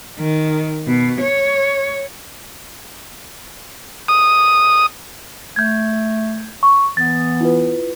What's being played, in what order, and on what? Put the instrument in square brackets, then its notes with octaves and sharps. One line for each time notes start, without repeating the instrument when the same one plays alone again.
[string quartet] D#3
B2
C#5
[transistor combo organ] D#6
[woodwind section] A3 [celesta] G6 G#6
[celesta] C#6
[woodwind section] E3 B3 [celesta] A6
[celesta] E4 F4 B4